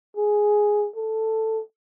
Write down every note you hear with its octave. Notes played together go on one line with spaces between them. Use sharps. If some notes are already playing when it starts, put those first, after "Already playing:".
G#4
A4